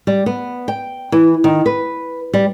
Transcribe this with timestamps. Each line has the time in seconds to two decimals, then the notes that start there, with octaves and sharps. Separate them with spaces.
0.07 G3
0.26 B3
0.68 G5
1.12 E3
1.44 D#3
1.66 B4
2.34 G3